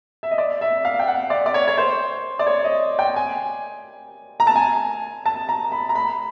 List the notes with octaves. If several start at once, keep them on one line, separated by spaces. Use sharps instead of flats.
E5
D#5
D5
E5
F5
G5
F#5
D5
D5
C#5
C#5
C5
D5
C#5
D#5
G5
G#5
A#5
A5
G#5
A5
A#5
B5
A#5
B5